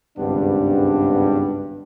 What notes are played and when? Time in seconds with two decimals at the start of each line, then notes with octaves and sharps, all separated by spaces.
0.18 G#1 C#2 G2 B3 D4